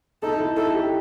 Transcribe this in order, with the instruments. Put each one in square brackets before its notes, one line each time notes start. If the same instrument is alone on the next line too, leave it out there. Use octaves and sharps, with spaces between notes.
[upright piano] D#4 [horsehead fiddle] A4
[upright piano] E4
[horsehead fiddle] A4
[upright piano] G4